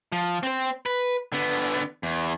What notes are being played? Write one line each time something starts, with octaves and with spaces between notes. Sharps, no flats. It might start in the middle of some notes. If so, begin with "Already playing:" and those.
F3
C4 C5
B4
D3 B3
E2